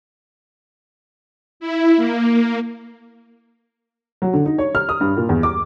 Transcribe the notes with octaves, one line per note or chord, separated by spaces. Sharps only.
E4
A#3
F#3
D3
D#4
C#5
F6
D#6
G2
A#2
E2
D6